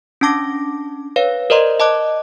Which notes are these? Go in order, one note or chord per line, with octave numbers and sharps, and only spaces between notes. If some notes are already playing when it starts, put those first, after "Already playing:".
C#4 D4 A5 D6 A#6
B4 C#5 F5
A#4 C5 D5 D#5 A#5 C6
D#5 A5 D6 F#6